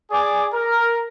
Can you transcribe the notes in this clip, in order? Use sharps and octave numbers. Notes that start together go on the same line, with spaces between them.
G#4 D5 G#5 D6
A#4